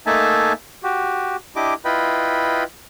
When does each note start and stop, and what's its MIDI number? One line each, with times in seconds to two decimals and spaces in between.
0.06 0.53 57
0.06 0.53 58
0.06 0.53 63
0.06 0.53 76
0.06 0.53 80
0.06 0.53 81
0.83 1.36 66
0.83 1.36 67
1.56 1.74 62
1.56 1.74 64
1.56 1.74 67
1.56 1.74 75
1.56 1.74 86
1.85 2.64 64
1.85 2.64 65
1.85 2.64 71
1.85 2.64 75
1.85 2.64 79
1.85 2.64 83